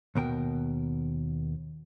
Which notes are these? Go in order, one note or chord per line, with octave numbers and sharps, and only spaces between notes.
D#2 B2 A#4 G5